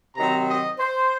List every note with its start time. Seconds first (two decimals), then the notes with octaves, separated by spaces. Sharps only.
0.16 C3 D#3 F#3 C4 A#5
0.48 D#5
0.79 C5